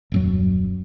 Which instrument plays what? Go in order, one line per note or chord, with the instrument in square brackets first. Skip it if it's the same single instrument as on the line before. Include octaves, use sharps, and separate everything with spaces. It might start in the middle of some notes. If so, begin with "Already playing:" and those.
[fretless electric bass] D#1 F#2 F#3